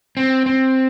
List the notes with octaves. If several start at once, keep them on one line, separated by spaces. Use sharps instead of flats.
C4
C4